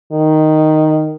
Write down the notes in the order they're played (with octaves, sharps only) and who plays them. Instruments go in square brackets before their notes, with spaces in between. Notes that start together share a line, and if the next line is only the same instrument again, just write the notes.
[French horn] D#3